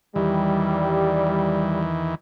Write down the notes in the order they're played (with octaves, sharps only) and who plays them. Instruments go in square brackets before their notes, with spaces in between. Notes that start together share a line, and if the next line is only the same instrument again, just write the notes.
[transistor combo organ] E2 D#3 E3 [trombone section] G3